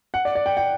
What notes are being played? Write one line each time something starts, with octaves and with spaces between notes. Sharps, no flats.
F#5
D5
D5
G5
G5